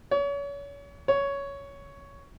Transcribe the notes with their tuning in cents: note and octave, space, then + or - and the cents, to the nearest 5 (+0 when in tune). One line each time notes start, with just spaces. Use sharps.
C#5 +35
C#5 +10